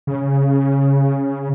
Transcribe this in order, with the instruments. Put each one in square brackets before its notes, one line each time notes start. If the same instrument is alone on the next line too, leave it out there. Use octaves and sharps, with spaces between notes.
[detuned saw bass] C#3